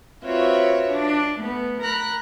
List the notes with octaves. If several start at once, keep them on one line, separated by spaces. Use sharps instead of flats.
C4 F4 F#4 B4 C#5 E5
D4
A3 B3
A#4 A#5 B5 F#6